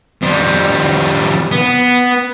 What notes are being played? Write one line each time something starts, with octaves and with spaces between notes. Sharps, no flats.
F2 G3
B3